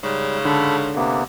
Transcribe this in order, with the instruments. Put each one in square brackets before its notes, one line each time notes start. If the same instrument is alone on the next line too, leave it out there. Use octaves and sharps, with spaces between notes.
[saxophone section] G#2 C#3 [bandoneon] G3
[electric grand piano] D3 [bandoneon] A4 B5
[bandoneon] C3 A#3 B3